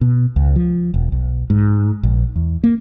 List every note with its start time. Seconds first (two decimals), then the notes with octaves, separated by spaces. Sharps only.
0.01 B2
0.36 C#2
0.56 F3
0.94 E1
1.12 B1
1.50 G#2
2.03 A#1
2.36 E2
2.64 A#3